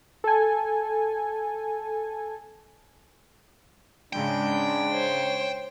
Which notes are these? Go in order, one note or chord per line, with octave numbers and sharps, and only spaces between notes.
A4 G#5
G#2 C#3 G#3 D4 G5
C5 C#5